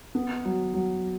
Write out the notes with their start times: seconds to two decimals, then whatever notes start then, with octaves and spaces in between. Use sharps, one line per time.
0.15 B3
0.45 F#3
0.74 F#3